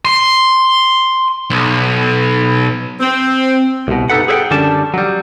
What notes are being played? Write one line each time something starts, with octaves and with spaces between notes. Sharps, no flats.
C6
B1
C4
C2 B2
G2 C3 D#4 A4 B4 F#5
G#4 A4 C5 E5 F#5 G5
F#2 D3 G3 C#4 D4 A5
F#3 G3